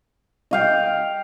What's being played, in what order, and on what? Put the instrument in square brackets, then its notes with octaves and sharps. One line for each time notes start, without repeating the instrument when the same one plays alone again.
[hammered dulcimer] D#5 F5 G5